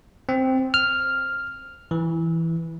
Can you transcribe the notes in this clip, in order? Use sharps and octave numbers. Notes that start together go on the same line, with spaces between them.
C4
F6
E3